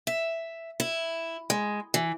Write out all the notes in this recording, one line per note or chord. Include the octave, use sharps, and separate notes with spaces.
E5
E4
G#3
E3